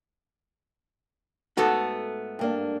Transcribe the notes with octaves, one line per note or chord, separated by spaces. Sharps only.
G#2 A3 B3 F#4 A4
G2 A#3 D4